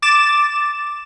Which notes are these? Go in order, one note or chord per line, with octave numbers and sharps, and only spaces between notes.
D6 A6 E7